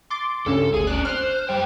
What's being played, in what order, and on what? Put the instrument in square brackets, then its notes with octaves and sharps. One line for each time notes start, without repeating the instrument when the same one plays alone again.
[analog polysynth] C6 D6 A6
[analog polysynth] C#2 G2 C#3 [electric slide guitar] A4
[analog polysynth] G1 D2 D#7 [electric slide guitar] G#4
[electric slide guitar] C#4 D5 [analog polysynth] F#6 D7
[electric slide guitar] C5 [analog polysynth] F6 F#6
[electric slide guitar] F#2 G3 G5